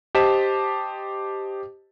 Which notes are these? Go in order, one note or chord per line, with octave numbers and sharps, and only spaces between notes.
G4 C5 D#5 A5 B6 E7